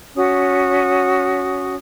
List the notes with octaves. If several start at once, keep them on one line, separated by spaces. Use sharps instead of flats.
C#4 F#4 D#6